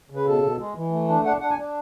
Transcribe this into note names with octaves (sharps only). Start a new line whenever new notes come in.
C#3
B4
B2 A4
B2
G#3
E3
A3
D4
D4 F#5
D4 F#5
G#5
D4